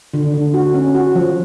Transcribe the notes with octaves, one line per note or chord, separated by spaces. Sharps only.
D3
D3
F#4
C#4
F#4
F3